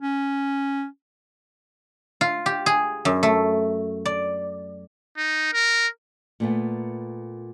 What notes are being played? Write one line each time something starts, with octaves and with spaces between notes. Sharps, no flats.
C#4
F4
G4
G#4
F#2
A3
D5
D#4
A#4
A#2 A3 B3